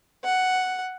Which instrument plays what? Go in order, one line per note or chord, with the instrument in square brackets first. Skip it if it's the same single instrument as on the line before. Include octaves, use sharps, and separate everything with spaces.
[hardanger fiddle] F#5